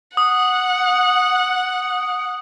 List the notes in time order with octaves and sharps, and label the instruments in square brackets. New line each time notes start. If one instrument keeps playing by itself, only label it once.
[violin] F#5 [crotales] D#6